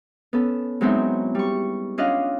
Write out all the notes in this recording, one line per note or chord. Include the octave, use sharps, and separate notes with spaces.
B3 C#4 A4
F#3 G#3 B3 C4 D#4 E4
G3 C#6
C#4 D4 F4 D#5 F5 F#5